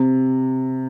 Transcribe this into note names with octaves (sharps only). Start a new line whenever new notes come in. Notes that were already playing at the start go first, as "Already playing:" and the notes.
Already playing: C3